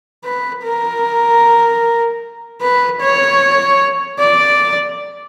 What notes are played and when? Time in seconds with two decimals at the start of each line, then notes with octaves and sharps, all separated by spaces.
0.25 B4
0.64 A#4
2.62 B4
3.01 C#5
4.20 D5